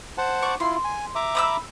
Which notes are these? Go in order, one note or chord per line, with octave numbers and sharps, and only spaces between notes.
C5 F#5 A5
D5 C#6
E4 F4 C6
G#5
E5 A#5 D6
B5 D#6 E6